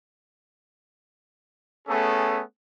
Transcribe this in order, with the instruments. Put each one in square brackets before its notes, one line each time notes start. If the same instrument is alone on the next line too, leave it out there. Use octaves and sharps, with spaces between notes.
[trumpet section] A3 B3 C#4 G#4 A4